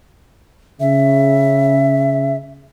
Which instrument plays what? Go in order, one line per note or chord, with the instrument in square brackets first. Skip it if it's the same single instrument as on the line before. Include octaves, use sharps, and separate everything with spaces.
[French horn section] C#3 [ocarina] E5